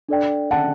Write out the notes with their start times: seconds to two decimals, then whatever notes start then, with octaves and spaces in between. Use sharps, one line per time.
0.09 D4 A4 D5 G5
0.51 F#5 A5